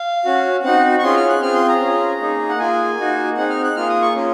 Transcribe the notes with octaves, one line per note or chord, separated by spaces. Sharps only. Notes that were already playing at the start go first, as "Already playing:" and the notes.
Already playing: F5
C#4 F#4
C4 D#4 F#4 F#5
C#6
C#4 F4 G#4 C6
F6
F#6
C4 F4 G#4 F6
C6
A#5
C#4 F4 G#4
A#3 D#4 G#4
F#5
A#3 F4 G#4 G#5
A#3 D#4 F#4
C4 D#4 G#4 F#5
F6
F#6
A#3 F4 G#4 F6
D#6
C#6
A#3 C#4 F4